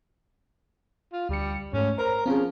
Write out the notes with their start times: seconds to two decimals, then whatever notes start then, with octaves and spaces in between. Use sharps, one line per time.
1.12 F4
1.29 D2 G3 C#7
1.73 G#2 A3 C#4
1.98 A#4 C5 A#5
2.26 F3 C4 C#4 G#4